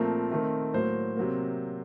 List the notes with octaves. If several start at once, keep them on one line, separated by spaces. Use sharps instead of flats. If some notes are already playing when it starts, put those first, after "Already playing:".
Already playing: A#2 F3 A3 C4 A#4
D#3 A3 C4
A2 F#3 A#3 C5
C3 F#3 A#3